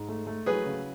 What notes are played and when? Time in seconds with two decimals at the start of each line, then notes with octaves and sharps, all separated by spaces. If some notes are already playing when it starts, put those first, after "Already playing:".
Already playing: G#2
0.08 A3
0.27 A3
0.46 F#3 G#4 B4
0.65 C#3